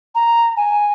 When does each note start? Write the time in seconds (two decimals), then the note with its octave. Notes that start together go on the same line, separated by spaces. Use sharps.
0.15 A#5
0.57 G#5